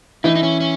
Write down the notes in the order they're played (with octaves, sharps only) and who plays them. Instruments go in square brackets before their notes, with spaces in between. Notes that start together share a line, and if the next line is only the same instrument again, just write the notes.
[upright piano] E3 E4 [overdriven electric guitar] D#4
[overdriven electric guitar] D#4
C#4
C#4